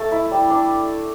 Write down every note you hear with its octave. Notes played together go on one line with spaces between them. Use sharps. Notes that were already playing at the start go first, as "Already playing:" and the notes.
Already playing: A3 A5
E4
G3
D4